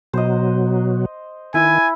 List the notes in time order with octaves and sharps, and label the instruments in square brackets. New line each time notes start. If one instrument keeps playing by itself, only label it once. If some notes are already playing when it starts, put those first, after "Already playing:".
[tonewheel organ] B2 F#3 [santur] C5 D#5
[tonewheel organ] D#3 [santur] E4 B4 [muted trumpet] G#5